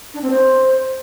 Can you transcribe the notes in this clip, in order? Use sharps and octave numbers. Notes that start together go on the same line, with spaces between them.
D4
C4
C5